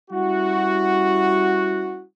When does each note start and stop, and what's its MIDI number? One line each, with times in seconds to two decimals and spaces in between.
0.11 2.04 55
0.11 2.04 61
0.11 2.04 64
0.11 2.04 66